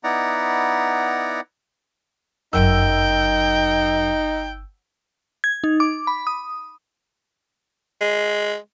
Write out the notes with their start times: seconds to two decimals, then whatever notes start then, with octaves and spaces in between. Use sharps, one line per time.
0.04 B3 D#4 E4 D5 F#5 A#5
2.53 G1 F#2 D#4 G5 E6
5.44 G#6
5.64 D#4
5.80 D6
6.07 B5
6.27 D#6
8.01 G#3